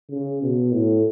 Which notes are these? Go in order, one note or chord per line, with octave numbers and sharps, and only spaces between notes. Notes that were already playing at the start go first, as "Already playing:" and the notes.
C#3
B2
A2